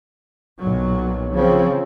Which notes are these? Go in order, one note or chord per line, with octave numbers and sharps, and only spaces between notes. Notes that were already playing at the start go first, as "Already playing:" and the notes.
B1 A#2 F#3
C#3 F3 C4